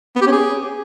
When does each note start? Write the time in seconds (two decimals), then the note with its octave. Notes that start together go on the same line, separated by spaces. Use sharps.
0.16 B3
0.21 G4
0.27 C#4
0.32 G#4